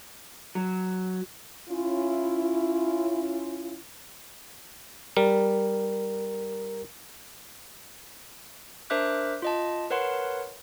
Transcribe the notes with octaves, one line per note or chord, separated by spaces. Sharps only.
F#3
C#4 E4 F4
G3 A#4
D4 A#4 C5 E5 D6 F#6
F4 D#5 A5
A#4 B4 C#5 F#5 C6